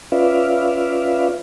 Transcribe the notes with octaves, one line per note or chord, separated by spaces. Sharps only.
C#4 F4 B4 D5 E5 F5